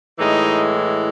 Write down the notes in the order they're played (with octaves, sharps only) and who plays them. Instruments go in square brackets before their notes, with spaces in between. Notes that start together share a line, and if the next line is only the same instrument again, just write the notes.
[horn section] A2 E3 G#3 D#4